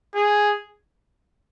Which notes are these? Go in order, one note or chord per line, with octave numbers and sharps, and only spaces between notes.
G#4